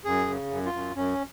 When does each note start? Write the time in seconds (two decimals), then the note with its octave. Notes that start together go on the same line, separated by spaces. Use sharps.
0.05 F#2 G#4
0.28 C#3
0.50 F#2
0.66 F4
0.73 F#2
0.96 F#2 C#4